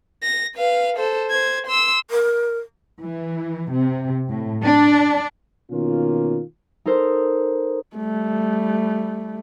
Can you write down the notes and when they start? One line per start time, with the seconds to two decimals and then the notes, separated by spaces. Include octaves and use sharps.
0.23 A#6
0.55 B4 F5
0.97 A4 C5
1.30 C5 G#6
1.67 C6 E6
2.11 A#4
3.01 E3
3.70 C3
4.28 A2
4.64 D4
5.71 B2 D#3 A#3 C#4 F4
6.86 D#4 A4 A#4 C5
7.96 G3 A3